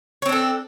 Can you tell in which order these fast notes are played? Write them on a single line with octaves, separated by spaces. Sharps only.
C#5 C4 D4 A4